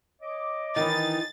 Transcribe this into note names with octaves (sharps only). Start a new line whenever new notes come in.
C#5 D#5 D6
D#3 E3 D#4 A6